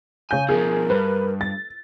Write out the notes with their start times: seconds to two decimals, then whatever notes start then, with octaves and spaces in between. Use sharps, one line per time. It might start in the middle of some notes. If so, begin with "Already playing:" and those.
0.31 C#3 G#5 G6
0.49 B2 F3 G#4 A#4
0.90 G2 B4
1.41 A6